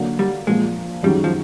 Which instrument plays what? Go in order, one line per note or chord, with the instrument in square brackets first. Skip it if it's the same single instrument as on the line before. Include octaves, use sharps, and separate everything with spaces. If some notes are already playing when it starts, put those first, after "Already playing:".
Already playing: [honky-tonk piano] D3 F#3 A#3
[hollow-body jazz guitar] G3
[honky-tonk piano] A#2 F3 A#3 [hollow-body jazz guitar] G#3
[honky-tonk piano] F#2 D#3 G#3 C#4 F#4 [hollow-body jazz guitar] G3
[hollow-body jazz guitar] F3